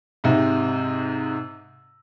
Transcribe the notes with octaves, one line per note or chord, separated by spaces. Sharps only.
G#2 C3